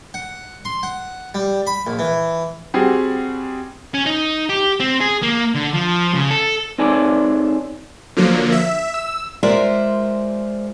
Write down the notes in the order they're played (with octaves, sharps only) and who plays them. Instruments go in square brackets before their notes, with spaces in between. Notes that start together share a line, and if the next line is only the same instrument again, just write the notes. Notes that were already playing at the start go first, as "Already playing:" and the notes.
[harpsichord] F#5
C6
F#5
G3
B5
A#1
E3
[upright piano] G3 C4 F#4 G#4
[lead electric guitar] C#4
D#4
G4
C4
G#4
A#3
D3
F3
C#3
A4
[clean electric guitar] C4 D#4 G#4 A4 C#5 D5
[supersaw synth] D3 F3 F#3 A#3
E5
E6
[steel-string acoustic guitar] G#3 F4 A#4 C5 D5 E5